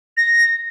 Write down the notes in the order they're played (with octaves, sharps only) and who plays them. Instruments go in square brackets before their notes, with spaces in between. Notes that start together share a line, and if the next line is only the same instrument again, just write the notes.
[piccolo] A#6